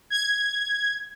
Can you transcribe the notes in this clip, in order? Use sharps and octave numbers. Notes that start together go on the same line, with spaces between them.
G#6